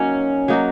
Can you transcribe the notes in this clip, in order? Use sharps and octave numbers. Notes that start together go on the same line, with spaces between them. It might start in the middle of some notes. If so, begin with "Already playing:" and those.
Already playing: F#3 A#3 C#4 D#4 F#4
F#3 A#3 D#4 F#4